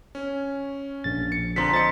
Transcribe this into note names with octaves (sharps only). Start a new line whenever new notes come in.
C#4
A#1 A6
C#7
D3 F3 C4 A#5 C6 B6
C5 D#5 A6 C#7